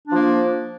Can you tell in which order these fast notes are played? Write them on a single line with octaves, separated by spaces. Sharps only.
D4 F3 A#3